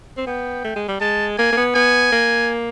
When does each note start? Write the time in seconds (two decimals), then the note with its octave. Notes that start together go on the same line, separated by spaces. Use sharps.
0.17 C4
0.27 B3 G5
0.64 A3
0.76 G#3
0.88 G3
1.01 G#3 A5
1.38 A#3 G#5
1.52 A#3
1.57 B3
1.75 B3 G#5
2.12 A#3